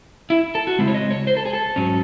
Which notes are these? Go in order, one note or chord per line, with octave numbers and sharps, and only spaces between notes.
E4
A4
F#4
C#3 G#3 C4 E4
C#5
D#5
C#5
C5
A4
G#4
A4
G#2 F#3 C#4